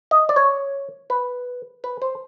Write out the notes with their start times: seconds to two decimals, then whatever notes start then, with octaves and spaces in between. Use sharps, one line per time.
0.11 D#5
0.29 D5
0.36 C#5
1.10 B4
1.84 B4
2.02 C5